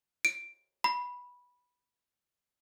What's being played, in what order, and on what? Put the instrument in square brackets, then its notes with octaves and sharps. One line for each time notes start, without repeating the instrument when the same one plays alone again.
[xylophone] D7
B5